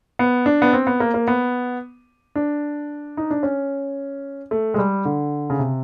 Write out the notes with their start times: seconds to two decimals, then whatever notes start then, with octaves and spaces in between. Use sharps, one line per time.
0.19 B3
0.46 D4
0.62 B3
0.73 C4
0.87 B3
1.00 A#3
1.14 A#3
1.28 B3
2.35 D4
3.17 D#4
3.30 D4
3.43 C#4
4.51 A3
4.74 G#3
4.78 G3
5.05 D3
5.50 C#3
5.59 C3